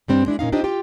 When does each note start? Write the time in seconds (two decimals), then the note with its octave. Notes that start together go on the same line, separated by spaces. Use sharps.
0.08 G2 G3 C4 D4
0.26 G#3 D4 E4
0.39 A#2 C#4 D#4 F5
0.52 D4 D#4 F4 G4 C5 D#5
0.64 F4 G4 G5